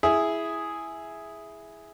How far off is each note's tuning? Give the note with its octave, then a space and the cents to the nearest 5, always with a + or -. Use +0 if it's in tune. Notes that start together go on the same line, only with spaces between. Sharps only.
E4 +0 G#4 +0